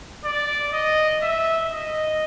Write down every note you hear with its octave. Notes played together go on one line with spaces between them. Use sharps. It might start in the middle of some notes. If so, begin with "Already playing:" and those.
D5
D#5
E5
D#5